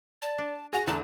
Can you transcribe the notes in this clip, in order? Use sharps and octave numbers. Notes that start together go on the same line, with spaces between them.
D5 A5
D4
F#4 G#4 G#5 A#6
E2 D3 A3 F#4 A5 A#5